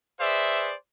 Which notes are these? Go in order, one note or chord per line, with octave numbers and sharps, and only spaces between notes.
G#4 B4 C5 D5 E5